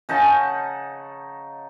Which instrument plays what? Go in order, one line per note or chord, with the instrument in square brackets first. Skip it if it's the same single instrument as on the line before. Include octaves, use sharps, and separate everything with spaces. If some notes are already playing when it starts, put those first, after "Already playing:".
[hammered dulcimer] C#3 D#4 F#5 A5